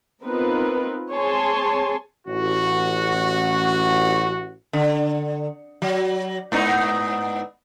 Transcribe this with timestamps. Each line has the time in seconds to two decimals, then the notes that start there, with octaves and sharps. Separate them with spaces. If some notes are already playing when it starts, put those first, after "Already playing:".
0.24 B3 C4 D#4 F4 A#4 B4
1.12 C4 G#4 C#5 G#5 A5 C6
2.26 A1 F#4
4.73 D3
5.82 F#3
6.52 G#2 B3 D#4